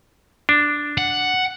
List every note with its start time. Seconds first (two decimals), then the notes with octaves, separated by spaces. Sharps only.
0.49 D4
0.98 F#5